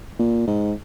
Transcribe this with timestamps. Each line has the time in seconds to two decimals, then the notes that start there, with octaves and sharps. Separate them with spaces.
0.19 A#2
0.47 G#2